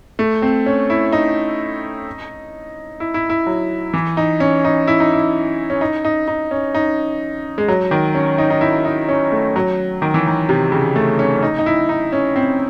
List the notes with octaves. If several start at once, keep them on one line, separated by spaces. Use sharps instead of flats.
A3
C4
C#4
E4
D#4
E4
E4
E4
F#3
E3
D#4
C#4
D#4
E4
D#4
E4
C#4
D#4
D#4
D#4
C#4
D#4
G#3
F#3
D#3
C#4
D#4
D#4
E4
D#4
C#4
A3
F#3
D#3
E3
D#3
C3
C#3
A3
C#4
C#4
D#4
D#4
E4
D#4
C#4
C4